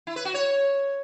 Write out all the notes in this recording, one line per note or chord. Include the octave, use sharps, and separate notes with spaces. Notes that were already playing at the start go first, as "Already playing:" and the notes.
E4
B4
F#4
C#5